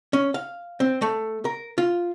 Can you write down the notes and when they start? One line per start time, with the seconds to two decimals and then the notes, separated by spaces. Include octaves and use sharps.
0.13 C#4
0.34 F5
0.80 C4
1.02 A3
1.45 A#4
1.78 F4